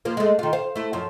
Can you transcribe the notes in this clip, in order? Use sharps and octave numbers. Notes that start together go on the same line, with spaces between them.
F3 A#3
G#3 A3
D#3 F4
C5 F5
A3 E4
F#2 F3